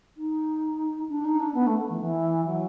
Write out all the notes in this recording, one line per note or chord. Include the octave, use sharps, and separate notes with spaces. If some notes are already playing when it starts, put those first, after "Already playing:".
D#4
D4
D#4
D4
B3
A3
E3
E3
F#3